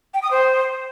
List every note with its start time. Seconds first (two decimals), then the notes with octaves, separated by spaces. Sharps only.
0.14 G5
0.23 D#6
0.31 C5